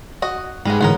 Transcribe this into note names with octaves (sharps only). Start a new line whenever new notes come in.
F#4 D#5
G#2 G3 G#3 B3
A2 D3 E3 B3 C#4 A#4